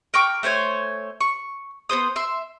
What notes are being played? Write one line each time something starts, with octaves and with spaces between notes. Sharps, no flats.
A#4 G5 C#6 D6
A3 C5 C#5 G#5
C#6
B3 G#4 C5 D#6
E5 C6